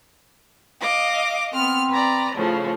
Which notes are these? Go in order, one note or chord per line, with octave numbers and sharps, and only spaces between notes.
D#5 F5 D6
B3 C4 F6
B4 D5 A#5
A2 C#3 F3